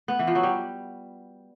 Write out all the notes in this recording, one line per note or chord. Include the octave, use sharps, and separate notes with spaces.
B3
E3
F3
F#3
G3